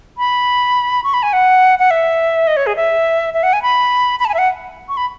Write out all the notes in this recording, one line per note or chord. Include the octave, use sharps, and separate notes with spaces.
B5
C#6
B5
G#5
F#5
F#5
E5
D#5
C#5
G#4
E5
E5
F#5
G#5
B5
B5
A5
G#5
E5
F#5
C#6
B5